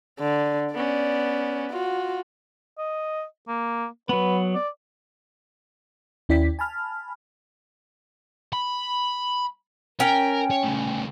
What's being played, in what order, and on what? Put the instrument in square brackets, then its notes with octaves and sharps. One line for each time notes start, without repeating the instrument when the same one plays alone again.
[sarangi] D3
[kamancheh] B3 C#4 [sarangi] D5
[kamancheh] F4 [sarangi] F#4
[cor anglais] D#5
A#3
[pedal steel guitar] F#3 B3 [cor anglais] B4
[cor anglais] D5
[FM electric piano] D#2 C#4 E4 D5 G5 B6
G#5 A5 B5 F6
[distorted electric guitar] B5
[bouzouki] C#4 G5 [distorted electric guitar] A#4
[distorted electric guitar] C#5
C#3 A3